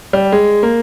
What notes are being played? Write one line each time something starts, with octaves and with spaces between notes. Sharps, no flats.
G3
G#3
A#3